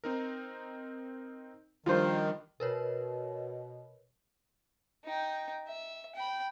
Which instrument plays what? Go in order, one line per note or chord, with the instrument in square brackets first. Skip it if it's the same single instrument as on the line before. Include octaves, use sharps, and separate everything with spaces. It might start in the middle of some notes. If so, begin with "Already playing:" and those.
[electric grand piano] C4 D#4 A#4
[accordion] D#3 [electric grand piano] F3 G3 D4 [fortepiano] F4 C5
[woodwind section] B2 [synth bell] A#4 B4 C#5
[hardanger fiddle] D#4 G5
E5
G5 B5